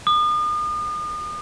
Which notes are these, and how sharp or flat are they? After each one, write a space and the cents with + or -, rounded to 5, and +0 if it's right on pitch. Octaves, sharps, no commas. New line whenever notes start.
D#6 -40